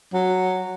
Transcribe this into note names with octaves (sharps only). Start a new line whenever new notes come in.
F#3